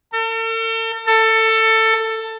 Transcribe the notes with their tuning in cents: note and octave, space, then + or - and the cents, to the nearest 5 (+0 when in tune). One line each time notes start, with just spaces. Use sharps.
A4 +45
A4 +20